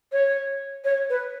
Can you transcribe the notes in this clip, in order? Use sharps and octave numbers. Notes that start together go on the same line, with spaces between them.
C#5
C#5
B4